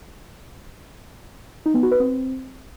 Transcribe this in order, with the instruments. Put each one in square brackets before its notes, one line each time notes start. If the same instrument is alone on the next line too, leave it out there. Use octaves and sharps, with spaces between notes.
[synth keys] D#4
B3
F#4
B4
C4